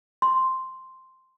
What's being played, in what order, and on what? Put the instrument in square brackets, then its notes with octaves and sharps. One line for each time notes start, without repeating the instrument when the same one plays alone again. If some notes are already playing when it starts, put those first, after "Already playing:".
[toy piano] C6